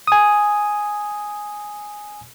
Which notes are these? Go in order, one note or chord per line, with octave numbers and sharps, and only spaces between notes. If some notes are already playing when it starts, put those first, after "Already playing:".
G#5 D#6